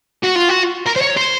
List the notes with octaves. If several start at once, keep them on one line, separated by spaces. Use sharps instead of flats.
F#4
F4
F#4
A#4
C5
C#5
C5